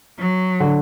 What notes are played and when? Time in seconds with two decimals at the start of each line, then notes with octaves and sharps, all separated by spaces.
0.18 F#3
0.60 D3